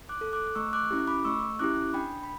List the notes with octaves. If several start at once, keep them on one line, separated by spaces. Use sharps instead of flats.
D6 F#6
A4
D6 F#6
A3 C#6 E6
D6 F#6
C#4 E4 G4
B5 D6
A3 C#6 E6
C#4 E4 G4 D6 F#6
D4 G5 B5
B5